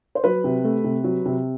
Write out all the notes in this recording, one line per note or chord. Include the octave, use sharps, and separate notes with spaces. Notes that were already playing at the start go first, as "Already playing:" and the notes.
C5
F#3 B4
C3
A3
C3
F#3
C3